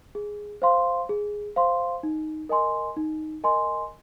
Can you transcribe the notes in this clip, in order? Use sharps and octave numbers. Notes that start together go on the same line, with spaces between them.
G#4
C5 F5 C6
G#4
C5 F5 C6
D#4
A#4 D#5 G#5 C6
D#4
A#4 D#5 G#5 C6